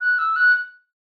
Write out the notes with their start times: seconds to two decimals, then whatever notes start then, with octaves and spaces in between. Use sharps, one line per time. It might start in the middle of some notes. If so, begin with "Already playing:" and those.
0.01 F#6
0.19 E6
0.36 F#6